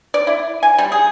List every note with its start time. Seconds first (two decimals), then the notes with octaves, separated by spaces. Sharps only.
0.14 D5
0.27 E4
0.63 G#5
0.78 G3
0.92 G#4